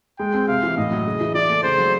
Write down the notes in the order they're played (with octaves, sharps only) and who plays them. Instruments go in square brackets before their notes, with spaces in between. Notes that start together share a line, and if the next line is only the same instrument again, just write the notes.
[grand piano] G#3 [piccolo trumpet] G5
[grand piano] C4
[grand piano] C3 [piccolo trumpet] F5
[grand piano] E3
[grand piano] A2 [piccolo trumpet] D#5
[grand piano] F#3
C#3
E3
[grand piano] E3 [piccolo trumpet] D5
[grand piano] A3
[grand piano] C#3 [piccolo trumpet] C5
[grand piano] F#3